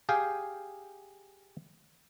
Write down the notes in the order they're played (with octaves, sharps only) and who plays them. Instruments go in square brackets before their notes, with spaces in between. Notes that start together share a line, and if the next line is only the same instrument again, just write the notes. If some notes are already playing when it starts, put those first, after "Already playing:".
[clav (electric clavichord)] G4 G#4 F5 G5 G#5